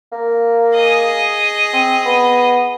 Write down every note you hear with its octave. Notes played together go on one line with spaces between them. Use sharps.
A#3
G#4 D#5
C4
B3